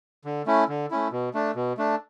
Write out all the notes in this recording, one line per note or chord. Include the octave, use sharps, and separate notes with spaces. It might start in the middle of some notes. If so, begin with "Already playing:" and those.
D3
A3 C#4 E4
D3
A3 C#4 E4
B2
A3 D4
B2
A3 D4